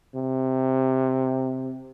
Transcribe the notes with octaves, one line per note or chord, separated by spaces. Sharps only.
C3